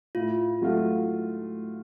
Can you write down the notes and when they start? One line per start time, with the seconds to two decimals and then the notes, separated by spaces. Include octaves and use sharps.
0.15 A2 F4
0.61 F#3 A3 F4